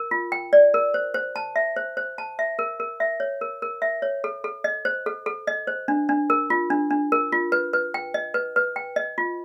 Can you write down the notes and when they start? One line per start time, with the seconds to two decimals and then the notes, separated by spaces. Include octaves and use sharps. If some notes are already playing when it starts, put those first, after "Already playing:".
Already playing: A#4
0.11 F4
0.32 G5
0.53 D5
0.74 A#4
0.94 C5
1.14 C5
1.36 A5
1.56 E5
1.76 C5
1.97 C5
2.18 A5
2.39 E5
2.59 A#4
2.80 A#4
3.00 E5
3.20 C#5
3.41 A#4
3.62 A#4
3.82 E5
4.02 C#5
4.24 A4
4.44 A4
4.64 D#5
4.85 C5
5.06 A4
5.26 A4
5.47 D#5
5.67 C5
5.88 D4
6.09 D4
6.30 A#4
6.50 F4
6.70 D4
6.90 D4
7.12 A#4
7.32 F4
7.52 B4
7.73 B4
7.94 G5
8.14 D#5
8.34 B4
8.56 B4
8.76 G5
8.96 D#5
9.18 F4